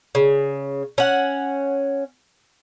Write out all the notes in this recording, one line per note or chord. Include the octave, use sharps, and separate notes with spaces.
C#3
C#4 F#5